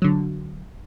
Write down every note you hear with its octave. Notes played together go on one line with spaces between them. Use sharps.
D3 F#3